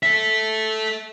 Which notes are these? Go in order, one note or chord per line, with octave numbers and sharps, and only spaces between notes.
A4 E5